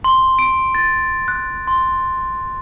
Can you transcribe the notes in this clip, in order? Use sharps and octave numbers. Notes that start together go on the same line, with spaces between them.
C6
D7
A6
F#6
C6